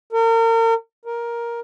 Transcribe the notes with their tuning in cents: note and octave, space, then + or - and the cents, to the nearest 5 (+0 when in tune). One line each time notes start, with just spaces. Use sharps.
A#4 -35
A#4 +10